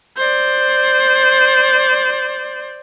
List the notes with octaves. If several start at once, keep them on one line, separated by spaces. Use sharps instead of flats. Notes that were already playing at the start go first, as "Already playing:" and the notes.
C5 D5